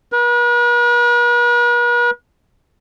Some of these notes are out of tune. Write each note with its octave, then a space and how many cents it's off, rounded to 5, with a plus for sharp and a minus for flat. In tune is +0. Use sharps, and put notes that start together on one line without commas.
B4 -45